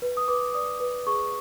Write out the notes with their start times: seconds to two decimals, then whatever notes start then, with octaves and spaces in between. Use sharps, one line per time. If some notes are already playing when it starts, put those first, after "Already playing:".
0.02 B4
0.17 D#6
0.28 B4 D6
0.54 D5 D#6
0.80 B4
1.07 G#4 C#6